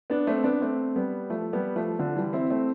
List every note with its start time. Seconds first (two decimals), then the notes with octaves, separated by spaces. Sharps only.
0.10 B3 D4
0.27 A3 C4
0.44 B3 D4
0.61 A3 C4
0.96 G3 B3
1.30 F3 A3
1.53 G3 B3
1.76 F3 A3
1.99 D3 F3
2.15 E3 G3
2.33 C4 E4
2.50 A3 C4